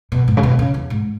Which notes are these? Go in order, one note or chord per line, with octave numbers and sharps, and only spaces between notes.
B2
G#2
C#3
B2
C#3
E2
G#2